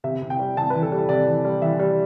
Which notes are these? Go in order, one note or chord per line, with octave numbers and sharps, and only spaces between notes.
C3 E5
C3
G5
G3
C3 A5
B4
E3
A4
G3
C3 D5
E3
G3
E3 E5
G3